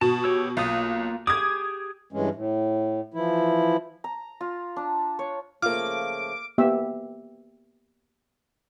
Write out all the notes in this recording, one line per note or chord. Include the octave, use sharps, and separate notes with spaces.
B2 A5
G4 C#5 E6
B1 A#3 F4 D#6
G4 G#4 D6 D#6 G#6
G2 E3 G#3 C#4
A2
E3 F3 E4
A#5
F4
D4
C#5
C#3 F3 A3 A#3 F4 D6 F6
A#3 B3 G4 E5